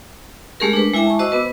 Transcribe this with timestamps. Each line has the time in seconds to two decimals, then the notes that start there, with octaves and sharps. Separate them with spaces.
0.60 G#3 A3 C#4 G4 G#4 A#4
0.73 D4 B4
0.94 G#3 E4 E5 G5 G#5 D6
1.06 A5 C#6
1.19 F#4 C5 D#5 D6 E6
1.32 B3 B4